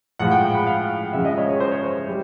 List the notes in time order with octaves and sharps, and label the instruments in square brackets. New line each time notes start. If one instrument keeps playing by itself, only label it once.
[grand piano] A2 F3 G#3 F#5
G5
B5
F5
C#3 F3 G#3 E5
D#5
C#5
C#5
C5
C#5
C5
G3